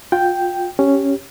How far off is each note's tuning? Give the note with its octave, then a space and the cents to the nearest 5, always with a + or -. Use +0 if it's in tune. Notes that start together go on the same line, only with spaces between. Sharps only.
F4 +25 G5 +0
C#4 +0 G4 -5